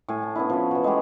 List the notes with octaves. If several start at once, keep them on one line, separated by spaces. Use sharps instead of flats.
A2 G#5
A5
B3 C#4 D4 E4
F3 C#4
E3 F#4
G#3 A3 B3 G4